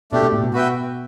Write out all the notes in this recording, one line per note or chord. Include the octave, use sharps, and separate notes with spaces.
B2 A3 D4 G4
B2
A2
B2
F#4 B4 E5 G5